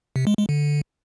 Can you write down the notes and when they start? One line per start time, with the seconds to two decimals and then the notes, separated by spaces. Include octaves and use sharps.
0.16 C3
0.27 G#3
0.38 G#3
0.49 D3